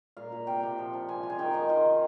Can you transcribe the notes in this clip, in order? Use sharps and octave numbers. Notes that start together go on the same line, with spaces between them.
A#2 F5
A#2
C3 G5
C3
F3
F3
C3 G#5
F4
G#5
D#3 G5
D#3 D#5
D#3 F4
D#3